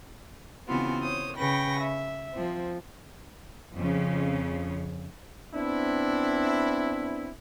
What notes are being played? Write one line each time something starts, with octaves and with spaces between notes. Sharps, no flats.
C#3 E3 B3 C4 F4 F#4
C5 C#5 D#6
C#3 B4 G5 C#6 A#6
E5
F3 C4
F2 C#3
B3 C4 D4 E4